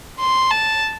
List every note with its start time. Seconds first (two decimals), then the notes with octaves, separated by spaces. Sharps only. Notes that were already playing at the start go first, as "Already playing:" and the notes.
0.19 C6
0.51 A5